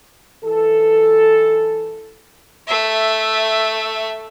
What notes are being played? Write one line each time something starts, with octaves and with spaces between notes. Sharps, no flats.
E3 A4
A3 E5